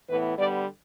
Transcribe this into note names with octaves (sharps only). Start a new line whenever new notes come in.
A2 E3 B3 B4
D3 G3 B3 D5